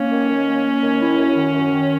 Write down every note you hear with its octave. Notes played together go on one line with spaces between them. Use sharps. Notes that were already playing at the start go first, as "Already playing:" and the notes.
Already playing: A#3 C#4
D#3
D#3
A#3
A#3
D#3
E4
F#2
D#3
F#2
D#3